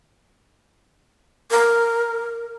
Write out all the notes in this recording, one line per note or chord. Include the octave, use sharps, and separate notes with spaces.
A#4